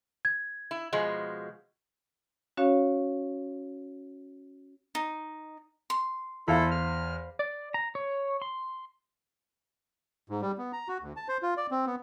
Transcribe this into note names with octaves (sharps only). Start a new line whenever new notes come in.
G#6
E4
B2 F3 G#3
C#4 F#4 C#5 F5
D#4
C6
E2 E4 A4 C5 F5 B5
F6
D5
A#5
C#5
C6
G#2
G3
B3
A#5
F#4
D2
A5
C5
F4
D5
C4
B3